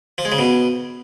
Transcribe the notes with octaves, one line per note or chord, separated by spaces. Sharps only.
F3
G#3
C#3
B2